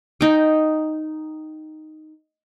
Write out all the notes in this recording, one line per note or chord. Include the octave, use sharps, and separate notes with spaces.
D#4 G5